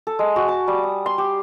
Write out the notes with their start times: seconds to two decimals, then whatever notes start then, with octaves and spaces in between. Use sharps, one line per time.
0.07 A4
0.19 G#3
0.36 F#4
0.48 A5
0.68 G3
0.83 D#6
1.06 C6
1.18 G4